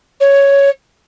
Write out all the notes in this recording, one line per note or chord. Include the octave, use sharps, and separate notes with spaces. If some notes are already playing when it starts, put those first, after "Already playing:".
C#5